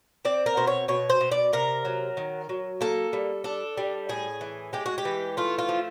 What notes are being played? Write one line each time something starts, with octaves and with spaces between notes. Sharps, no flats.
C4 D5
A#4
B2 C5
C#5
B2 C#5
C5
B2
D5
C3 A#4
F#3
D#3
F#3
A#3 A4
G3
D4 A4
G3
A2 G#4
E3
G#3 G4
F#4
G4
E3
A3 F4
F4
F3